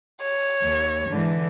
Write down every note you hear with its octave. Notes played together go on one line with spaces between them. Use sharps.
C#5
D#2
G#2 D3 E3